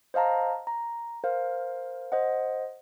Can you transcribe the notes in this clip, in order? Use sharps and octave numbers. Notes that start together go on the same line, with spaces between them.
C5 D#5 F5 A5 A#5
A#5
A#4 C5 F5
C5 D#5 F#5